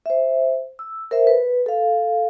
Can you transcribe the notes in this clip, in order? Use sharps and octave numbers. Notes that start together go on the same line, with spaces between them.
C5 E5
E6
A#4 C5 E5
B4
A4 F5